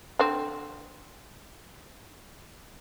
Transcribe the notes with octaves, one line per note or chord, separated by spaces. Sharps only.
D3 C4